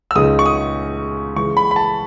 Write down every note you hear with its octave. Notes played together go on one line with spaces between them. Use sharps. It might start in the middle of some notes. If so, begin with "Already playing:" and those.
E6
C#2 C#3 G#3 D#4 D#6
C#6
D#6
C#3 E3 G#3 C#6
B5
B5
A5